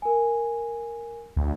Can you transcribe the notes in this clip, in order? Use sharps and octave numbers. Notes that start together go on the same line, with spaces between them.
A#4 G#5
D2